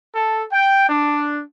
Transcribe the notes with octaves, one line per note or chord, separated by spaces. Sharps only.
A4
G5
D4